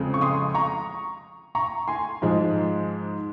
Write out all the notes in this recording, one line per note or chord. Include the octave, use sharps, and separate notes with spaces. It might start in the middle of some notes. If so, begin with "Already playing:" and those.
Already playing: F2 C#3 G#3 C4
C#6
C6 D#6
A#5 C#6
A#5 C#6
G#5 C6
G#2 F3 G#3